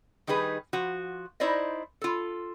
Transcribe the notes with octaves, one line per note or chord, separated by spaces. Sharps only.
D#3 G3 D#4 G#4 B4
F3 F#4
D#4 E4 C5 D5 D#5
F4 A4